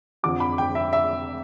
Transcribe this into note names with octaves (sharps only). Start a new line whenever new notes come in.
F2 D3 F3 D6
B5
G5
E5
E5